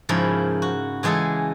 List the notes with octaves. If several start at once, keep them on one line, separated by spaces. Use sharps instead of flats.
G#2 C#3 F3 E4 A#4 B5
F#4
C#3 E3 G#3 G#4 A4